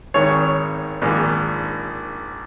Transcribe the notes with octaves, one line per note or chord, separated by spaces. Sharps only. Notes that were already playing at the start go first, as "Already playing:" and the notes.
G#1 G#2 D#3 C#5
A#1 G#2 D#3